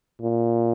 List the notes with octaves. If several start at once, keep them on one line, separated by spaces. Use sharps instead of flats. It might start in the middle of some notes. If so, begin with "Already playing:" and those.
A#2